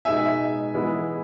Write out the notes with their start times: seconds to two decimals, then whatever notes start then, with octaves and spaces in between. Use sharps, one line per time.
0.05 B2 G#3 D#4 E5 G#5
0.74 E3 G#3 B3 E4